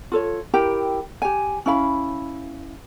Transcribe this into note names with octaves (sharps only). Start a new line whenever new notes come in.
F4 A4 C#5
E4 G4 A#4 G5
G4 G#5
C#4 E4 F5 B5